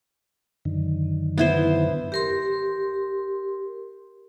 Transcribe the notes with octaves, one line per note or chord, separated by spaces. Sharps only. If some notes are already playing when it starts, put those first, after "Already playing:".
F#2 D3 D#3
B3 E4 C5
G4 A#4 C6